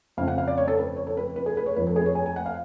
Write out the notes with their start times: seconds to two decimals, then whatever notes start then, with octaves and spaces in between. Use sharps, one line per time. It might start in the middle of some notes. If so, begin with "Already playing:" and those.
0.17 F2 C#3 F3 F5
0.28 F#5
0.38 F5
0.48 D5
0.57 C#5
0.68 A4
0.78 B4
0.97 C#5
1.07 A4
1.17 B4
1.36 B4
1.46 G#4
1.57 B4
1.66 C#5
1.76 F2 F3 B4
1.87 A4
1.96 G#4
2.02 B4
2.06 C#5
2.15 G#5
2.26 G#5
2.36 F#5
2.46 F5